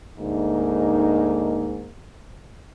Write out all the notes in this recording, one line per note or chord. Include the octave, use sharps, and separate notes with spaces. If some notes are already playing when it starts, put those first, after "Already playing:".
D2 G#2 A#3 D#4